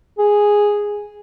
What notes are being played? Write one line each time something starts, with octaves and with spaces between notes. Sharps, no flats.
G#4